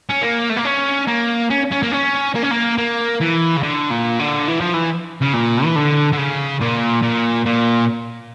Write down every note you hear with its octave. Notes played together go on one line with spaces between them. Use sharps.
C#4
A#3
A3
A#3
C#4
A#3
C#4
C#4
A#3
C#4
A#3
C#4
A#3
A#3
E3
C#3
D3
A#2
D3
E3
F3
E3
C#3
A#2
E3
D3
D3
C#3
A#2
A#2
A#2